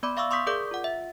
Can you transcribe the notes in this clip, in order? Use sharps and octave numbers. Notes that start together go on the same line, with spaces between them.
B3 D5 B5 D6
E5 F5 C#6 D6 E6
C6 C#6 D#6 G6 B6
G#4 A#4 D5 D6 G6
F4 F#5
E5